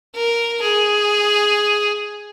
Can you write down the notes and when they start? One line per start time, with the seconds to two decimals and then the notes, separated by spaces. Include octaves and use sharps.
0.15 A#4
0.62 G#4